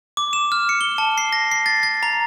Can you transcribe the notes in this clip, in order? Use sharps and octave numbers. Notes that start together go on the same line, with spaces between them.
D6
E7
F6
C#7
G7
A5
C7
A#6
C7
A6
A6
A#5